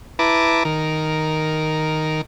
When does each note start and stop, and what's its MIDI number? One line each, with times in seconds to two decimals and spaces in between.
0.19 0.63 64
0.19 0.63 71
0.19 0.63 81
0.19 0.63 82
0.19 0.63 86
0.65 2.21 51
0.65 2.21 70